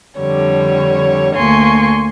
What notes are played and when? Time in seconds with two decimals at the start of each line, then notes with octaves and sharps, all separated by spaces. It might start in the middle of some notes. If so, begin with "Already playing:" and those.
0.18 F2 D3 G3 C#5
1.34 D2 A#3 G#5 C6 C#6